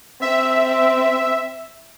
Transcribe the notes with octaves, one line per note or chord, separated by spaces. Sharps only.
C4 E5